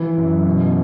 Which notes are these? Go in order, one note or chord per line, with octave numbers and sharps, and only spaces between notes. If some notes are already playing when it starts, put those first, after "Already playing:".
Already playing: E3 E4
F#2
B2